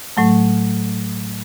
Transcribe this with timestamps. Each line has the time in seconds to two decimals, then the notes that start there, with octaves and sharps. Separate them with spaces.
0.17 A2 F#3 A3